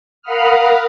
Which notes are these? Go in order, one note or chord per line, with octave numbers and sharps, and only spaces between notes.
A#4 F5 F#5 B5 D#6 F6